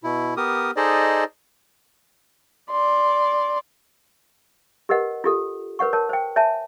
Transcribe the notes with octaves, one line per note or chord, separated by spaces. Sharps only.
B2 E4
B3 G4 A#4 D#6
D#4 G#4 A4 C5 D5 D#5
D5 C6
G4 A#4 B4 D#5 F#5
F4 G4 A4
A#4 B4 C#5 F#5 C#6
A#4 C#5 A5
C5 G5
C#5 E5 G#5 A5